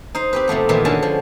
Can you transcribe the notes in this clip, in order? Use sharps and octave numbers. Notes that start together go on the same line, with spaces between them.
D#4 C5
C4 G4 B4
C3 F3 A3 B3
A#2 D#3 E3 A#3 B3
D3 G#3 C#4 F#4 A5
F3